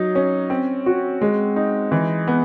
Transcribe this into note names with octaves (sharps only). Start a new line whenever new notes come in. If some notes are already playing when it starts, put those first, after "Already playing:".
Already playing: F#3 D#4
C#4
C4
F#4
G#3
D#4
E3
B3